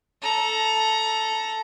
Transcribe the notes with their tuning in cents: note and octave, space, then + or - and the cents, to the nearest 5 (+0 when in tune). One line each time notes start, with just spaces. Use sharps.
A4 +0 A#5 +20